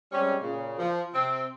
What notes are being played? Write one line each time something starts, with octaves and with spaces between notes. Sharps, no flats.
G3 G#3 C4 C#4
A#2 C#3
F3
C3 C4